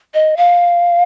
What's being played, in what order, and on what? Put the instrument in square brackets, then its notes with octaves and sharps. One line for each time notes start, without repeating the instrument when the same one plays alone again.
[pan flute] D#5
F5